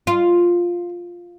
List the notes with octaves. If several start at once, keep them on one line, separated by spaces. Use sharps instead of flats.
F4